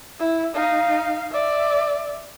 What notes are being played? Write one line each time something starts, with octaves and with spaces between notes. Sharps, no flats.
E4
D#4 F5
D5 E5